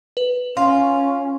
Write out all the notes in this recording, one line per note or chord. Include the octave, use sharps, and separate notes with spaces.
B4
C#4 F4 C6